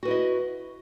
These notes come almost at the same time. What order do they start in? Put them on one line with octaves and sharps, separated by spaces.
F#4 B4 E4 D#5